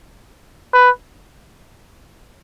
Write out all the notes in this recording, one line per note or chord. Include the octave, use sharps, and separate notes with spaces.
B4